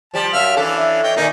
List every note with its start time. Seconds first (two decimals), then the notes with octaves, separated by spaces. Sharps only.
0.14 F3 G3 A5
0.33 F#2 E5 F5 F6
0.57 E3 C#4 D4 A4
0.76 E5
1.04 C#5 D#5 G5
1.17 A#2 D#3 A#3 C#4 D#4